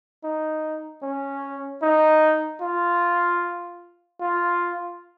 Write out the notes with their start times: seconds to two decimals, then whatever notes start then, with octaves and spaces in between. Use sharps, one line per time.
0.24 D#4
1.03 C#4
1.83 D#4
2.62 F4
4.20 F4